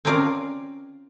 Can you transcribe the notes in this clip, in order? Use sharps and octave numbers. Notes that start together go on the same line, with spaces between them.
C4 C#4 F4 A#4 D5 F5